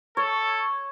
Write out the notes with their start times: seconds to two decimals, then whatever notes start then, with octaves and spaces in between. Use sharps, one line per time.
0.17 A4 C#5